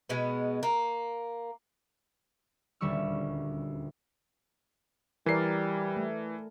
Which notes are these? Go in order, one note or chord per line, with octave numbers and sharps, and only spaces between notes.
B2 G#3 B3
A#3
D#1 D2 G3 C#4 C#6 E6
E3 G3 A#4 D5 C7
A3